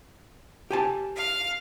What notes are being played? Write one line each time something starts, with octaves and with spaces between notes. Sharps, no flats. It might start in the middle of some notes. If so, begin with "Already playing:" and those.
G4 G#5 A5
F5